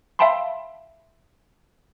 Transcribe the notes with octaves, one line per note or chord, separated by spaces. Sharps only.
E5 F5 G5 A5 B5 C6